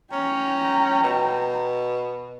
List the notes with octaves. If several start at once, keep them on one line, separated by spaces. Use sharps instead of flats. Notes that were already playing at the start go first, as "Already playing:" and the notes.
C#4 G5 A#5
B2